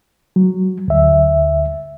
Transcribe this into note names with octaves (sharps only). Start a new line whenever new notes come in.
F#3
D2 E5